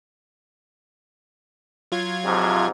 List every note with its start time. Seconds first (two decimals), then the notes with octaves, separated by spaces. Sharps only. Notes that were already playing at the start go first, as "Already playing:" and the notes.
1.92 F#3 F4 G#6
2.24 F2 G#2 C3